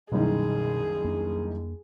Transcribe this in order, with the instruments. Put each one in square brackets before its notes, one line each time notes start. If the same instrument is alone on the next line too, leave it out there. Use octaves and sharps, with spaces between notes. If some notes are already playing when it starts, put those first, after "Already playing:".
[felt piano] F#1 C2 D#3 [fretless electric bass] B2 C#4 [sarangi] G#4
[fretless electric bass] F2 A#3 D4